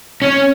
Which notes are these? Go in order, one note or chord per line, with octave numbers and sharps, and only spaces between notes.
C#4